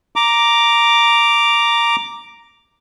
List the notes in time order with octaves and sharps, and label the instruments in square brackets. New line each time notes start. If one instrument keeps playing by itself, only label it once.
[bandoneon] A#5 D6